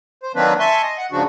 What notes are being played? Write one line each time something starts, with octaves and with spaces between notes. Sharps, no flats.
C5
D#3 F#3 A#3 C4 D4 B4
E5 G#5 A5 C6 C#6
D#5
F#5
G#2 C#3 F3 D4 F#4